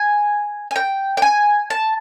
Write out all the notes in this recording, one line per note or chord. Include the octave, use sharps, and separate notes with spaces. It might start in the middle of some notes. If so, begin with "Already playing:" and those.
Already playing: G#5
G#5
G5
G5
G#5
A5